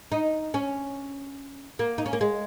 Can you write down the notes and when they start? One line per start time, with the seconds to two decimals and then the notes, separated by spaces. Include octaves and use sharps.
0.12 D#4
0.54 C#4
1.79 A#3
1.98 D#4
2.06 C#4
2.13 A#3
2.21 G#3